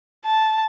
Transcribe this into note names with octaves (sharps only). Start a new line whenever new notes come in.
A5